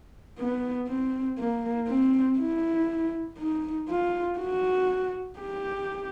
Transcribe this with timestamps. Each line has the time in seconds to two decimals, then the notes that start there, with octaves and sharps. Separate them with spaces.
0.39 B3
0.88 C4
1.39 A#3
1.88 C4
2.39 E4
3.39 D#4
3.89 F4
4.39 F#4
5.39 G4